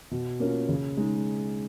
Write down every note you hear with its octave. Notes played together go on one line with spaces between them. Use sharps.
B2
A#3 C#4 F4
C#3
G#3 D#4